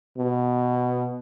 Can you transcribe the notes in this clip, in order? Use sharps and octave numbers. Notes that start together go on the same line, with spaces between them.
B2